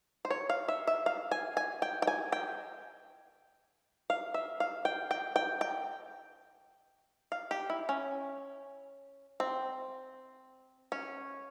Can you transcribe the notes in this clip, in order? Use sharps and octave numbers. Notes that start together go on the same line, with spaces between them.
C5
C#5
F5
E5
E5
F5
G#5
G#5
G5
G5
G#5
G5
F5
E5
F5
G5
G5
G5
G5
F5
G4
E4
C#4
C4
C#4